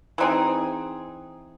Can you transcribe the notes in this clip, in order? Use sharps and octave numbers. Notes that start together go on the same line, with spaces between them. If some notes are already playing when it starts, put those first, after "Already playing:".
E3 C4 D#4 G#4